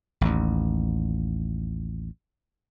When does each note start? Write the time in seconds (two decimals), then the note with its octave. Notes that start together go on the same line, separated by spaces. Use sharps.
0.21 A1 D#2